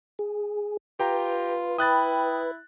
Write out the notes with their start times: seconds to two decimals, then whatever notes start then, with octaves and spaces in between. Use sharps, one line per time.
0.19 G#4
0.99 F4 G4 B4 G5 A#5
1.78 E4 G5 B5 D#6 F#6 A6